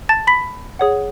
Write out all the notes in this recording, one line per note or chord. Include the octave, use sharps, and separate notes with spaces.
A5 A6
B5 B6
G#4 C#5 F#5